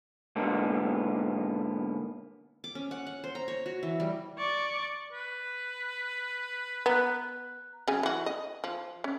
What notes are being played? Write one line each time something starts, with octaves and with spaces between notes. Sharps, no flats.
G#2 B2 D3 G#3 A#3 B3
D6
C#4
F#5
F#5
C5
A#5
C#5
F#4
E3
G3
D5 C#6
B4
B3 A#5 F#6
C#3 F#3 G#5
E3 F#4
D#5
F3
C#4